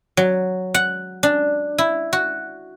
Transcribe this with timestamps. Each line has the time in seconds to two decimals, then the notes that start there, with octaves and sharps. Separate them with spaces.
0.17 F#3
0.74 F#5
1.23 D4
1.78 E4
2.13 F#4